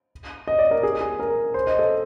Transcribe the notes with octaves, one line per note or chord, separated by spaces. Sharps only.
D#5
D5
A#4
G#4
G#4
A#4
C5
D#5
A4